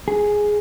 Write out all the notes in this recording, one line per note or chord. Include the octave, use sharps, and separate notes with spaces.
G#4